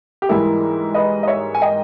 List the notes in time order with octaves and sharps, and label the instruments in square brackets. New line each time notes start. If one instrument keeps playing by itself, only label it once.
[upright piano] G4
G#2 E3 G3 A#3 E4
B4 D#5
D#5
C#5 E5
G#5
D#5 G5